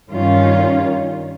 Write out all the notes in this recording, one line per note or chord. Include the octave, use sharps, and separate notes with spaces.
G2 D#3 G3 C#4 F4